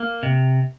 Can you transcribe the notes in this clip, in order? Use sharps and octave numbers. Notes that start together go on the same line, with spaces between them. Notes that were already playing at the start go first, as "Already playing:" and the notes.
Already playing: A#3
C3